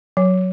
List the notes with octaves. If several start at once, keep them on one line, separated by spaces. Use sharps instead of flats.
F#3